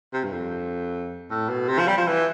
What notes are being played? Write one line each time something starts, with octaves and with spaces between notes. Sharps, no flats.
C3
G2
F2
A2
B2
C3
F3
G3
F3
E3